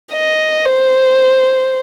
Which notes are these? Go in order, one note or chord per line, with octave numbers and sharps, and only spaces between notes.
D#5
C5